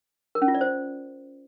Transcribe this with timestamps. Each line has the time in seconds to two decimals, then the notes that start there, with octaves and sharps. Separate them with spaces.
0.35 A#4
0.42 C#4
0.48 F4
0.54 D5
0.61 C5